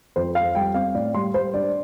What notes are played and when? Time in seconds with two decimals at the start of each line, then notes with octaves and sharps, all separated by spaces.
0.16 F2 C5
0.35 F2 F5
0.55 G3 G5
0.74 C4 F5
0.95 A2 D5
1.14 G3 C6
1.34 G3 C5
1.54 D4 D5